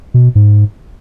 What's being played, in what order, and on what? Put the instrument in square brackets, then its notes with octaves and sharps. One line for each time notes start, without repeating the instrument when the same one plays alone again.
[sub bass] B2
G#2